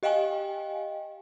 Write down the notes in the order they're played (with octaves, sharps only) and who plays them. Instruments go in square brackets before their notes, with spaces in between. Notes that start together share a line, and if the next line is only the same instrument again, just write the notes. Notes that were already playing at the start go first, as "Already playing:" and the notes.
[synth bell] G4 D#5 F5 G5 G#5